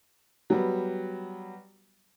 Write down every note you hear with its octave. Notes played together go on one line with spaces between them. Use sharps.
F#3 G3 B3